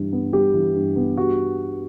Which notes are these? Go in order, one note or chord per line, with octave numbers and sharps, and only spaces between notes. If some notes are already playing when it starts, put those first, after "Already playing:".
Already playing: G2 E3 G3
B3
G3 G4
E3
G2
B3
G3 F#4